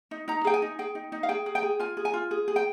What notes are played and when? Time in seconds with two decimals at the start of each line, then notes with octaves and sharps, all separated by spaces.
0.11 D#4
0.28 D#4 A#5
0.44 G#4 G5
0.54 G#5
0.62 D#4
0.79 G#4 G5
0.95 D#4
1.12 D#4
1.23 F5
1.29 G#4 G5
1.46 G#4
1.55 G5
1.63 G#4
1.79 F4 G#5
1.97 G#4
2.05 G#5
2.13 F4
2.31 G#4
2.48 G#4
2.56 G5